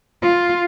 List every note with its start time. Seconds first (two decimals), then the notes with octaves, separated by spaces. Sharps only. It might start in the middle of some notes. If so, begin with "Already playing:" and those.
0.22 F4